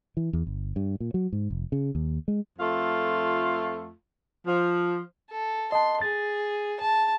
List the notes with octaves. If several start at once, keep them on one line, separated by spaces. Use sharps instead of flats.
E3
E2
G1
G2
A#2
F#3
G#2
F1
C#3
D#2
G#3
F2 A3 F4
F3
A4
D#5 A5 C6
G#4 A6
A5